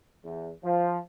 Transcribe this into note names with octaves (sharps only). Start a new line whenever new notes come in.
E2
F3